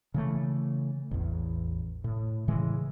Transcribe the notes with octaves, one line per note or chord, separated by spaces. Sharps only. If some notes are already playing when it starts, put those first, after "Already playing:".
C#3 E3 A3
A1 E2
A2
A2 C#3 E3 G#3